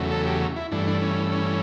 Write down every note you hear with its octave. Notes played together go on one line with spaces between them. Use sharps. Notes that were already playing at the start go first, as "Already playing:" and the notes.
Already playing: E2 C#3 F#3 A3
A4
G4
E4
G2 E3 A3 D4
D4
C#4
C#4